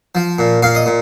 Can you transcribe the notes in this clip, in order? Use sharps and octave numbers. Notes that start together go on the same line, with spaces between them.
F3
A#2
A#2 F5
D#5
A#2